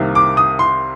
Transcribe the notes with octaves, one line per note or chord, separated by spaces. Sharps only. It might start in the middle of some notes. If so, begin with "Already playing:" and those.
Already playing: C2 C3 D#3 A#3
D6
D#6
C6